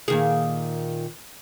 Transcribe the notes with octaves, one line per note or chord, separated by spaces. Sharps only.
A#2 D#3 G#4